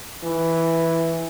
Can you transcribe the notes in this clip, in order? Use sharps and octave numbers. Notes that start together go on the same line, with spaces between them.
E3